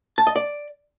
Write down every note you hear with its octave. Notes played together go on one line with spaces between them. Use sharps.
A5
D#5
D5